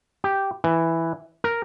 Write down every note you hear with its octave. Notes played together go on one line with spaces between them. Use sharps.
G4
E3
A#4